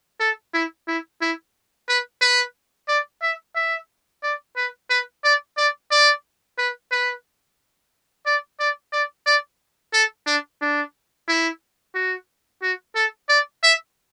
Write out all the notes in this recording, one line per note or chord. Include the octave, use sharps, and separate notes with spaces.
A4
E4
E4
E4
B4
B4
D5
E5
E5
D5
B4
B4
D5
D5
D5
B4
B4
D5
D5
D5
D5
A4
D4
D4
E4
F#4
F#4
A4
D5
E5